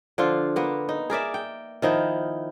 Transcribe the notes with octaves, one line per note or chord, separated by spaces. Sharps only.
D3 F3 F4
A#3 B3
D#4
G#4 A#4 D5 E5
G5
D#3 F3 D#4 E4